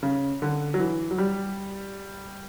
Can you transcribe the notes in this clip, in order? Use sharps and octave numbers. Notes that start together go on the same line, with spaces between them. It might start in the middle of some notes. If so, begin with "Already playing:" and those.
C#3
D3
F#3
E3
F#3
G3